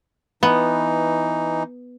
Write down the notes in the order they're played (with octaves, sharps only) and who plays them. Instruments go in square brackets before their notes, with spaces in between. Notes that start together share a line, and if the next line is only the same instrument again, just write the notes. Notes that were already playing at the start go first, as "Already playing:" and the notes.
[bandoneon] E3 D#4 [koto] B3